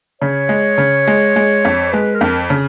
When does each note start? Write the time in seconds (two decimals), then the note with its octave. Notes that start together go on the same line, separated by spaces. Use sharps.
0.21 C#3 C#5
0.49 G#3
0.78 C#3
1.07 G#3
1.36 G#3
1.65 F2
1.92 G#3 B4
2.14 A#4
2.21 F2
2.50 C#3